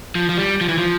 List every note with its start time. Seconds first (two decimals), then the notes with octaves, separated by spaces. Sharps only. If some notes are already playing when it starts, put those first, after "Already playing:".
0.15 F3
0.29 F3
0.38 G3
0.61 F3
0.69 E3
0.78 F3